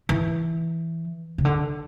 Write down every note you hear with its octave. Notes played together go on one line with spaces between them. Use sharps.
E3
C#3
D3